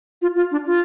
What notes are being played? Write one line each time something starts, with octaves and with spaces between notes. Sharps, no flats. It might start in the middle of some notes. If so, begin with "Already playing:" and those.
F4
F4
D4
F4